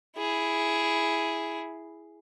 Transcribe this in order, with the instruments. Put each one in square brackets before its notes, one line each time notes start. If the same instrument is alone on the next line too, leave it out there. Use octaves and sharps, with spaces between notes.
[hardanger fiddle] E4 G#4